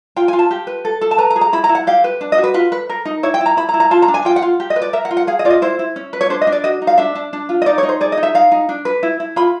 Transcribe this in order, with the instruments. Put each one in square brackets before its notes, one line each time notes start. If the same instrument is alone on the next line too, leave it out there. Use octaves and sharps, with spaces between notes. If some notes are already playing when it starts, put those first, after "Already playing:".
[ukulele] F4 G5
G#5
F4
A5
G4
B4
A4
A4
A5
B4 A#5
A#5
G#4
A#5
E4 B5
A#5
E4
F#5
G4 F5
B4
D4
D#5
F#4
B4
F4 B4
B4
A#4
D#4
E4 C#5
G5
E4
A#5
E4 B5
A#5
E4
A#5
F4 A5
A#5
D4
G#5
F4 G5
F#5
F4
G4
D#5
B4
D5
A#4 E5
F#5
F4
F#5
G#4 F5
D#5
F4 D5
D#5
E4 C5
E4
C#4
B4
C#5
D4 C5
D#5
D4
D5
F#4 D#5
D#4
F5
D4 E5
D4
D4
F4
D#5
D#4 D5
C#5
D#4
C5
G#4 D5
D#5
D#4
E5
D#4 F5
D#4
D4
B4
E4
E4
F4 B5